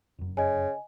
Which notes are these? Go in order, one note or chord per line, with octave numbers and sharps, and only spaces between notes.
F1 F#2
C#3 D#5 G#5